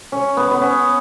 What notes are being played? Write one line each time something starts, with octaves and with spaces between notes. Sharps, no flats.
C#4
B3
B3
C#4